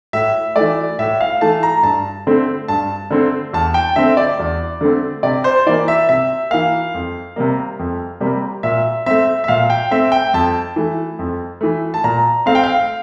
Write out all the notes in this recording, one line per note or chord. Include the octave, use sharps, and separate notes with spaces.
A2 E5
E3 A3 D5
A2 E5
F5
E3 A3 A5
A#5
G2 A5
D3 A3 C4
G2 A5
D3 A3 C4
E2 A5
G5
D3 A3 C4 E5
D5
E2
D3 A3 C4
C3 D5
C5
E3 A#3 D5
E5
C3 E5
E3 A#3 F5
F2
C3 G3 A#3
F2
C3 G3 A#3
A#2 E5
A3 C4 E5
E5
A#2 F5
G5
A3 C4 E5
G5
F2 A5
E3 A3
F2
E3 A3
A5
A#2 A#5
A3 C4 F5
G5
F5